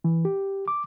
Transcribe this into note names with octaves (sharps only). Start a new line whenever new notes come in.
E3
G4
D6